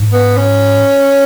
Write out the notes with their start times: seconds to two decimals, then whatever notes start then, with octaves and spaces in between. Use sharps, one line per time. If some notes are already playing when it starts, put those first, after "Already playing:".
Already playing: G#2
0.12 B3
0.36 C#4